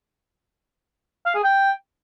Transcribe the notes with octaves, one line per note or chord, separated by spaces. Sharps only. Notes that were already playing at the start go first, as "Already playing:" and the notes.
F5
G#4
G5